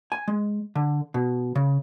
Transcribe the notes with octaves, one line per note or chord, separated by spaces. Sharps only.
G#5
G#3
D3
B2
C#3